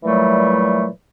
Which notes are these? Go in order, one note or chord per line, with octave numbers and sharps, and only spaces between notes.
A#2 E3 F#3 G3 A3